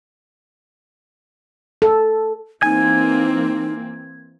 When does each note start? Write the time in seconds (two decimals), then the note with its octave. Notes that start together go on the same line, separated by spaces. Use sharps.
1.82 A4
2.63 E3 A#3 C4 D#4 G#5 G#6